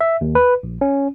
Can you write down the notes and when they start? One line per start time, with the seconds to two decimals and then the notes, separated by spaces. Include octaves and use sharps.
0.01 E5
0.21 D#2
0.35 B4
0.63 A#1
0.81 C#4